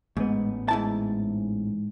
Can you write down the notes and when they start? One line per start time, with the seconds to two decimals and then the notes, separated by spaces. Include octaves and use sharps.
0.17 A1 G#2 A3 B3
0.69 G#2 E4 A5